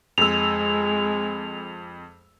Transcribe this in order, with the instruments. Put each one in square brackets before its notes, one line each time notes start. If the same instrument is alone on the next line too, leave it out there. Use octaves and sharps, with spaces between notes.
[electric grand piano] F2 E6 [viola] G#3 [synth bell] F7